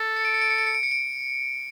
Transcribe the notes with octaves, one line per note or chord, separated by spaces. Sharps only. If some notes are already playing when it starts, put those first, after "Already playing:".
Already playing: A4
C#7
D7
C#7
D7
C#7
D7
C#7
D7
C#7
D7